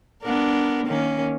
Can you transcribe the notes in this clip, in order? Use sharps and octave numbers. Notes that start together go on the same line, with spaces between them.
B3 D4 A#4
D#3 A#3 C#4